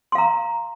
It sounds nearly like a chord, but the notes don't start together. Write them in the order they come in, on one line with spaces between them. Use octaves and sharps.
C6 F5 A#5